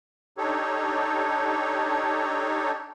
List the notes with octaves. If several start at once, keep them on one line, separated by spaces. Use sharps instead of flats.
D4 D#4 G4 A4 C#5